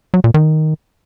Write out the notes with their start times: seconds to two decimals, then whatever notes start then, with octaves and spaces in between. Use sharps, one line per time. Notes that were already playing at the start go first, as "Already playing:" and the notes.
0.14 F#3
0.24 A#2
0.34 D#3